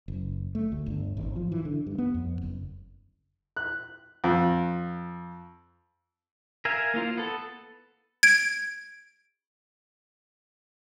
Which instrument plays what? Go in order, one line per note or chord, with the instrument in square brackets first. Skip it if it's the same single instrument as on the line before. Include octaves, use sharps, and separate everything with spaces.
[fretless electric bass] F#1
A3
D2
G1
G#1
F3
E3
D3
G2
B3
F2
F#1
[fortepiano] F#6
F2
[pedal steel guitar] A#4 E5 F5 G#5
A#3 E4 F4 C5
B3 A4
[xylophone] G#6 D7